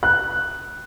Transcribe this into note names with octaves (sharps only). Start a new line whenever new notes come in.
F#6